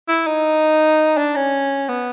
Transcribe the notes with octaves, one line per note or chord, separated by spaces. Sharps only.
E4
D#4
D4
C#4
B3